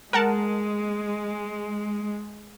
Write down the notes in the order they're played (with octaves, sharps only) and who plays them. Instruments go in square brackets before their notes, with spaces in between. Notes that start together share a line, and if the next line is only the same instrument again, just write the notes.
[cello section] G#3 [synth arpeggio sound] A#4 F#5 A5